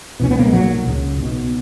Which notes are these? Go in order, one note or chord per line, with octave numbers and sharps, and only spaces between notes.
C#2 B2 C#4
B3
A#3
G#3
B1 A#2 F#3
C#2 C#3
B1 B2